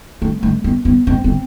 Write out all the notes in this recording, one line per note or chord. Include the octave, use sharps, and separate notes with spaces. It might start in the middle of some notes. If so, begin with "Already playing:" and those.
A3
A3
B3
B3
C4
C4